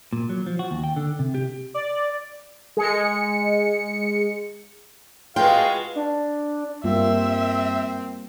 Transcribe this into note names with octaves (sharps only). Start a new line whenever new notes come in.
A#2
F#3
F3
F#4
D#2
G5
D3
C3
G4
D5
G#3 C#7
G#3 F4 F#4 G#4 B4 F5 G5
D4
G2 G3 A#3 C4 F4 E5